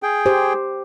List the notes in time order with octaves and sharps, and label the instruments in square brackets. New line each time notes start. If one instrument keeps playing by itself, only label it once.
[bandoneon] G#4 G5
[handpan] G4 C5